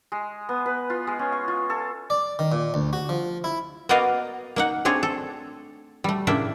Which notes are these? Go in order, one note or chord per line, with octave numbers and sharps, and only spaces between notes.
G#3
B3
B4
F4
G#3
C#4
C#6
F4
A4
D5
D#3
A#2
D2
F#4
F3
E4
A#3 B3 F#4 D5 D#5 F5
A#3 D#4 F#5
A3 C4 D4 G#4 C#5
A4
G3 A3
A2 C#3 A#3 D4 D5 E5